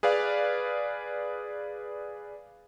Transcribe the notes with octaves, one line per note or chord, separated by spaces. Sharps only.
G#4 B4 D5 F5